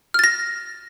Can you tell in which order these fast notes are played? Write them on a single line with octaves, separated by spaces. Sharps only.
F6 A6 A#6